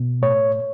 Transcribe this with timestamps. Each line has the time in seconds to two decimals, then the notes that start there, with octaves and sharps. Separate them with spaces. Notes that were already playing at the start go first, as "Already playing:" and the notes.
Already playing: B2
0.22 A2 C#5